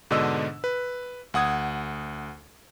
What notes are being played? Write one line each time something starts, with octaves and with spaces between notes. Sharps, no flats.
G#2 B2 D3 D4 D#5 E6
B4
D2 F#5 D#6 G#6